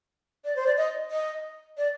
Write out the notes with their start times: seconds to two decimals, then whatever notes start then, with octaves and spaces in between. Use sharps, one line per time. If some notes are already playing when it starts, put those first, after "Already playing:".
0.44 D5
0.56 C5
0.66 D5
0.77 D#5
1.11 D#5
1.78 D5